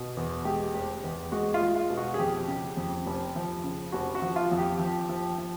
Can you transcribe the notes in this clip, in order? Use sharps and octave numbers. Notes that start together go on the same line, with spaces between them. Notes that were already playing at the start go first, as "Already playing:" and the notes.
Already playing: B2
E2
G#3 G4
F1
E2
G#3 F#4
F4
G#3
F4
B2
F#4
G#4
F2 G4
C#3
F2
F1
F3
C#3
F1 F#4
F#4
F3
F4
F2
G4
F3
F3
F3